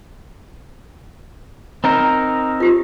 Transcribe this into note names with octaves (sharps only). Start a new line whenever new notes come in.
C4 D#4 A#4
F4 G4